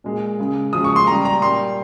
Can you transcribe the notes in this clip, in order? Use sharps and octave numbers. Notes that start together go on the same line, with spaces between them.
A#2 G#3
C#3 G#3
C#3 F3 G#3 D#6
C#6
C6
C#3 G3 A#5
A#5
A#2 G3 C6